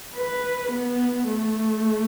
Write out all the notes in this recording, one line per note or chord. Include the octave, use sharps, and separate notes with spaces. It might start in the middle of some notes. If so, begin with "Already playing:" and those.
B4
B3
A3